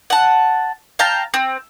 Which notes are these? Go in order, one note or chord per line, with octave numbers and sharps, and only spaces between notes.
F#5 A5
F5 G5 A5 A#5
C4